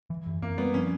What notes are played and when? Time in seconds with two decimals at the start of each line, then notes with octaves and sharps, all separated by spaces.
0.10 E3
0.26 F#2
0.42 F#2 A#3
0.58 G3 B3
0.74 F3 C#4